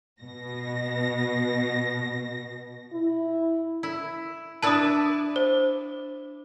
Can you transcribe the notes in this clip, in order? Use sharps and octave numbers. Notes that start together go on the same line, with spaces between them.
B2 A#6
E4
E4
D4 E4 B4 A5 D#6
C5